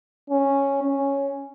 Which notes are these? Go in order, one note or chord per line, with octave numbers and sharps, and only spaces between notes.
C#4
C#4